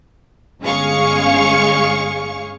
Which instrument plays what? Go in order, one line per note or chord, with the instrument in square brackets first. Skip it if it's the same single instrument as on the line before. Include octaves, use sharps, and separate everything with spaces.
[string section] G1 G#3 C#4 G#4 F5 C#6